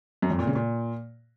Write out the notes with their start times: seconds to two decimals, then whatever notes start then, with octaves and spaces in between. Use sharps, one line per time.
0.22 F#2
0.31 F2
0.39 A#2
0.47 C#3
0.55 A#2